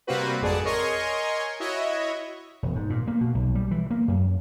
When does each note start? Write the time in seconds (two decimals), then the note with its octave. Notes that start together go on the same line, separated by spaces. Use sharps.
0.07 C3 G3 A#3 C4 F#4 B4
0.42 G#1 F2 G#4 D5 F#5 A5
0.65 A#4 C#5 D#5 G#5 C6 C#6
1.60 E4 F#4 C#5 D#5 E5
2.63 E1
2.75 G#2
2.90 A#2
3.08 A#3
3.21 B2
3.35 B1
3.55 G3
3.71 E3
3.91 A#3
4.08 F#2